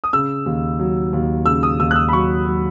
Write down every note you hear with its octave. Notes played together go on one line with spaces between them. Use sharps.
D#6
C#3 E6
D#2
F#3
D#2
C#3 E6
D#6
D#2 E6
F#6
E6
B5
F#3 C#6
F#3